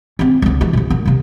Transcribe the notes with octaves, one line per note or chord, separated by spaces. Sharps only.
C4 C#4
C#2 D3
E3 A3
D2 A#2
A#3
C3 A#3